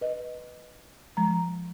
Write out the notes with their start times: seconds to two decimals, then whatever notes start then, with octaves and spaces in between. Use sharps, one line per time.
0.01 B4 D#5
1.17 F3 G#3 A#5